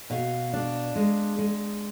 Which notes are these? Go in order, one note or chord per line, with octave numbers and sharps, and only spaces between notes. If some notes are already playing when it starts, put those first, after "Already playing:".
B2 F5
D4
G#3
G#3